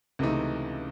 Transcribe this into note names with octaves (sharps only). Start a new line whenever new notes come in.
C#2 C3 E3 A3 D#4